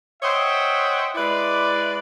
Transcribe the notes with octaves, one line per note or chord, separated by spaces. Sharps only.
C5 C#5 D#5 E5 F#5 G5
G#3 E4 B4 D5